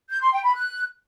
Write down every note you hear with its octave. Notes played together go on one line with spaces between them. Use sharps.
G6
C6
G5
B5
F#6